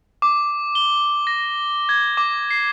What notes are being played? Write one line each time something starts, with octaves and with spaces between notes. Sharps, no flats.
D6
G7
A#6
G#6
D6
C7